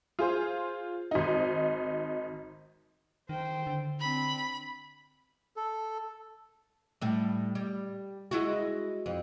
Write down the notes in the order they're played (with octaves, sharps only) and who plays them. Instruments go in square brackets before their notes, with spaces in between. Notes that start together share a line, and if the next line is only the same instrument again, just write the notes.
[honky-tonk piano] F4 G#4 C5
G#1 D#4
[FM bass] D#3 [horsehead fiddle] C5 G5
[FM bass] D3
[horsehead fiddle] C4 D4 [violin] B5
[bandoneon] A4
[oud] A2 G3
G3
G#3 E4 F#4
F2